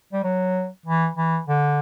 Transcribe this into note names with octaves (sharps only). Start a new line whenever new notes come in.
G3
F#3
E3
E3
D3